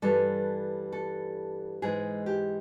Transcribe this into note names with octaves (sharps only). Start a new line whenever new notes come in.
G2 E3 G3 A4
A4
G#2 E3 G#3 G#4
G4